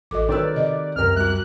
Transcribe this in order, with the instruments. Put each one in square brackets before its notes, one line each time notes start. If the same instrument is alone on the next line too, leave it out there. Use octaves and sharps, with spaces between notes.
[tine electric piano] A1 D#5 [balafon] F#4 A4 D6
[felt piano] D#3 B4 E6 [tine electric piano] C#5 [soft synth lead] D5
[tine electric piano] C3 [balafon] D#5
[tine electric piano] C#2 F#2 [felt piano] C3 A#4 [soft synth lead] F6
[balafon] G3 F#4 [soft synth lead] F#6